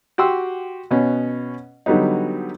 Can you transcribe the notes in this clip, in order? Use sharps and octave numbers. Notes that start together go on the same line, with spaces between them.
F#4 G4 G5 C6 E6
B2 B3 C#4
D3 F#3 G3 B3 D#4